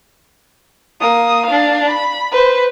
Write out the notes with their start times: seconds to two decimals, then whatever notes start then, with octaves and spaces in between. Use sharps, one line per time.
1.01 A#3 D#6
1.46 D4 F5
1.89 B5
2.32 B4 C5